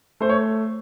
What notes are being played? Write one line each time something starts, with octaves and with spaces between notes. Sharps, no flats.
A3 C5
C#5